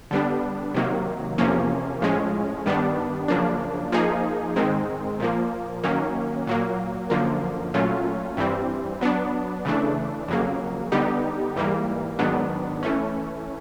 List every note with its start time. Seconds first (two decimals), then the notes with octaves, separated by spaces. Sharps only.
0.11 D3 G3 B3 D4
0.74 C3 D#3 F#3 A#3
1.38 E2 C3 F3 A#3 C#4
2.02 A2 F3 G#3 C#4
2.66 G2 D#3 G3 B3 D4
3.28 F#2 C#3 F3 A#3 D4
3.92 F3 A#3 D#4 G#4
4.56 G#2 D#3 G#3 C4
5.20 A#2 F3 A#3
5.84 D#3 F#3 A#3 C#4
6.47 A#2 F#3 A#3
7.10 F#2 D3 F3 A#3
7.74 A#2 F#3 A3 C#4 F4
8.37 G2 E3 G3 C4
9.01 F#3 B3 D4
9.65 C#3 E3 A3 D4
10.28 F2 C#3 F#3 A#3
10.92 D3 G3 B3 D#4 G4
11.56 G#2 E3 G3 A#3
12.19 G#2 D#3 F#3 B3 D4
12.83 E3 A3 C#4